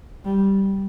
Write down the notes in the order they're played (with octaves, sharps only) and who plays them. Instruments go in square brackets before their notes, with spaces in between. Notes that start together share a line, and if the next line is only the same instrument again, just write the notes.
[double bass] G3